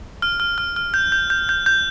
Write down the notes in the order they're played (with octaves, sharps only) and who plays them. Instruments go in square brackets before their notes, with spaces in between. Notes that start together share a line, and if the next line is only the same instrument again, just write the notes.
[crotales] F6
F6
F6
F6
G6
G6
G6
G6
G6